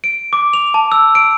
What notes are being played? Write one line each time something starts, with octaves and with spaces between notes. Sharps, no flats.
D7
D6
F7
A5
E6
D7